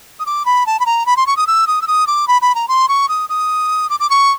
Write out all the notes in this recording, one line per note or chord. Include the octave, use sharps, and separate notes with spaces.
D#6
D6
B5
A5
B5
A#5
B5
C6
C#6
D#6
E6
D#6
E6
D#6
D6
B5
B5
A#5
C6
C#6
D#6
D#6
D6
D6
C#6